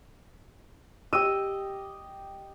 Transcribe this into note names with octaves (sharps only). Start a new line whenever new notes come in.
G4 D#5 E6 D#7